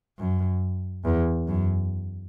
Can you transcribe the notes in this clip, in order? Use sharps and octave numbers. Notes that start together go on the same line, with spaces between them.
F#2
E2
F#2